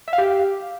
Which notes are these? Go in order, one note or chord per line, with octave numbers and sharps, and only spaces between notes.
E5
F5
G4